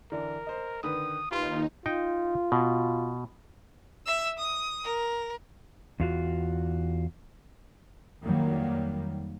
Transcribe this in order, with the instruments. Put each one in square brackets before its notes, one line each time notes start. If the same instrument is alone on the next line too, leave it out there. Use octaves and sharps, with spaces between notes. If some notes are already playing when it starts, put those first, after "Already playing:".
[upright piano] D3 E3 D4 [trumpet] A#4
[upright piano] C5 D#5
[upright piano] D3 D#3 B4 [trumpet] D#6
[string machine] D#2 D#4 [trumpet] F4 [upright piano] G4 B4 C6
[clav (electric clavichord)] D#4 G5 [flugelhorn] F4
[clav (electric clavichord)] B2
[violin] E5 E6
D#6
A#4
[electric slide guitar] E2 F4 F#4
[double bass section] F2 D#3 F#3 G3 A#3